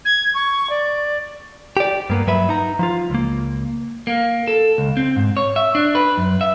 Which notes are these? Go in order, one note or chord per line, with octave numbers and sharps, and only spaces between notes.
G#6
C#6
D5
G4 D5
G2 A#3 B3
G2 F#3 B4 E5 B5
D#4 A#5
F3 F4
C#2 A#3
A#3
A4
C#2
C4
G#2
C#5
E5
D4
B4
F#2
E5